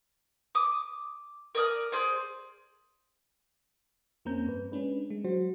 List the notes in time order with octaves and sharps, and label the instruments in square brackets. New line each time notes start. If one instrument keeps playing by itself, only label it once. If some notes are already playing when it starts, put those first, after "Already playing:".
[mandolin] D6 D#6
A#4 D5 D#6 F6
G#4 C5 D5
[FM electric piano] F2 A#3 C4 C#4 A#5 G6
G2 B4
G#3 C#4 D4 B4
G#3
F#3 F#4 C5